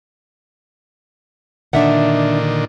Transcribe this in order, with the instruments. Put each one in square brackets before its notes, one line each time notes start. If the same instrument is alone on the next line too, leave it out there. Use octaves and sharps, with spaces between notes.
[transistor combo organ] A#2 D3 D#3 [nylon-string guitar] D4 E5 F#5